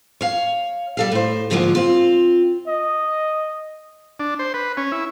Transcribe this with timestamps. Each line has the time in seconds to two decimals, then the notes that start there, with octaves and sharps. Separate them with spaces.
0.21 C#5 F5
0.97 G3 A4 F5
1.11 A2 C5
1.50 G#2 D3 F3 F#3 A3 A#3
1.75 C4 F4
2.68 D#5
4.19 D4
4.39 C5
4.54 B4
4.77 C#4
4.92 E4